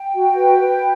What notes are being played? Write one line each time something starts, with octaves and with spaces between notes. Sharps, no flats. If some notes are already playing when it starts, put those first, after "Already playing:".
Already playing: G5
F#4
B4
B4